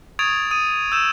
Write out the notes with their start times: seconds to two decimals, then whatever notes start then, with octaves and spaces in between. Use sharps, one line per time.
0.19 C#6 D#6 G#6 A6 D7 F7
0.51 D#6 D#7
0.92 E6 G6 E7